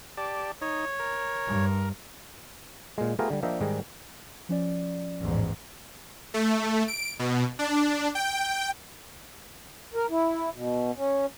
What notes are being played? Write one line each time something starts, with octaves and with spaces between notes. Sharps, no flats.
G4 D5 A5
D#4 C#5
A#4
G2
A#2 G#3
A3 B3 F4 G4 G#4 A#4
D3 G3
F3 A#3 D4 D#5 E5 G5
G#2 D#3 G3 G#4 D#5
F3 C#4 D5
A1 E2 G#2
A3
D7
B2
D4
G5
A#4
E4
B2
C#4